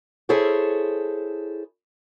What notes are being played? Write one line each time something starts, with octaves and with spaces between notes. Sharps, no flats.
E4 G#4 A4 C5 C#5